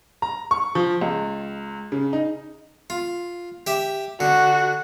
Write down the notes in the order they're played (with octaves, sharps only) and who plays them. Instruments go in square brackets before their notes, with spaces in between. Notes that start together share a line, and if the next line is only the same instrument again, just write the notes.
[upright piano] A#5
C#6
F3
C#2
C#3
D#4
[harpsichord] F4
G4 E5
[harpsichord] D3 [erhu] F#4